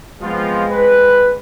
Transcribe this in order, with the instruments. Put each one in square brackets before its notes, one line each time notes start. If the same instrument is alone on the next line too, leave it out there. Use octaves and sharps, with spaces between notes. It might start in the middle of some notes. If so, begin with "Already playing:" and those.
[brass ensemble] F3 B3 F4 [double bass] G#3 C4
[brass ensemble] B4